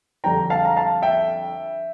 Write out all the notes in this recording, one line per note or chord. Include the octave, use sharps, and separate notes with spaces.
F2 D3 G3 D4 G5 A#5
F5 A5
A#5
F5 A5
E5 G5